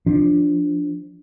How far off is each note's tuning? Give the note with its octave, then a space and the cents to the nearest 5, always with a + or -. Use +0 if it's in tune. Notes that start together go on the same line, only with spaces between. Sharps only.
F3 +0 D4 +0